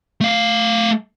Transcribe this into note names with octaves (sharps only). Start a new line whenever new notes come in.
A3 F5